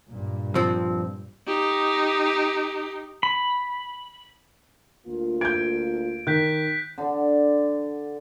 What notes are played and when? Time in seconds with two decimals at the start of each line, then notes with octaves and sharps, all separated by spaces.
0.11 G2 A#2
0.55 F3 C4
1.47 D#4 G4
3.23 B5
5.07 D2 A#3 F4
5.41 G6 G#6 D7
6.27 D#3 F#6 G6 B6
6.98 D3 D4 A4